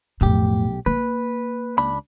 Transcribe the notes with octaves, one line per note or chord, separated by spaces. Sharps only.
B1 F2 A2 G4
A#3 B4
C#2 D4 B5